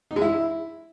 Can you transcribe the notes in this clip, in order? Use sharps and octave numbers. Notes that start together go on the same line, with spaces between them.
D#4
G#3
E4